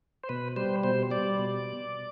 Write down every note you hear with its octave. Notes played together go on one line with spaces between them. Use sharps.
C5
B2 B4
G3 C5
B2 C5
G3 D5
B2